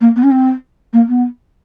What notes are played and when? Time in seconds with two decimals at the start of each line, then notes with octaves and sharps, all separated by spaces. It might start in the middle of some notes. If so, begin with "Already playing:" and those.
0.01 A#3
0.16 B3
0.23 C#4
0.31 C4
0.93 A#3
1.08 B3